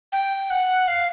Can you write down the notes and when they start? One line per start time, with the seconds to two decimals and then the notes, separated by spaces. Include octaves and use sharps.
0.12 G5
0.50 F#5
0.88 F5